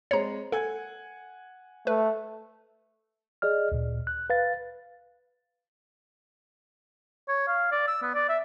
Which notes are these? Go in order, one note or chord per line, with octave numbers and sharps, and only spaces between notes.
G#3 C4 C#5 A#5 C#7
A4 F#5 G#5 G#6
A3 B4
G#4 D5 D#5 F6
D2 A#2
F#6
B4 F5 A6
C#5
F5
D5
E6
B3
D5
E5